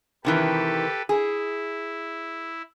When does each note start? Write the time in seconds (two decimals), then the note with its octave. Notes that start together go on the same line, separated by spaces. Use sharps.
0.25 C3 D#3 E3 G4 A4 B4
1.09 E4 G#4